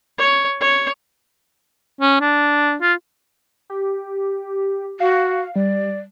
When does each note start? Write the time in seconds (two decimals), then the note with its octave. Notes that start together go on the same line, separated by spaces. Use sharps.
0.18 C#5
0.61 C#5
2.01 C#4
2.21 D4
2.81 F4
3.70 G4
5.00 F#4 F5
5.56 G3 D5